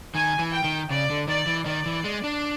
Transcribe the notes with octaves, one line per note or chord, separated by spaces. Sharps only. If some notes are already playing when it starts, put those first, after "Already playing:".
D#3 G#5
E3
G5
D#3
C#3 D5
D3
D#3 D5
E3
D#3 D5
E3
G#3
D4